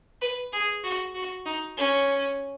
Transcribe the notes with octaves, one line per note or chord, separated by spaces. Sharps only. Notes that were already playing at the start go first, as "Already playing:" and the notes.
B4
G#4
F#4
F#4
D#4
C#4